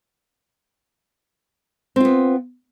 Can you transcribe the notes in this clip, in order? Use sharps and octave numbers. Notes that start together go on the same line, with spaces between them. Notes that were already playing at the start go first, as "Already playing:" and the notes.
B3 C4 F4